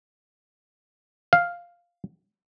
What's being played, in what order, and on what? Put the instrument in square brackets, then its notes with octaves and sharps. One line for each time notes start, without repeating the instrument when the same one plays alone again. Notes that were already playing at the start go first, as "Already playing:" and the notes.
[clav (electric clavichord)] F5